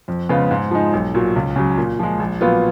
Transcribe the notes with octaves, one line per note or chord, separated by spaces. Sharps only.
F2
C#3 G#3 B3 F4
G#2
F3 G#3 D#4
B1
A#2 F#3
C#2
C#3 F#3
A#2
F3 G#3
A#1
A#2 F#3 B3 F4